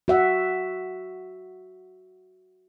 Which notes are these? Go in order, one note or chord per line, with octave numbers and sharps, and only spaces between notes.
F#4 E5 F#5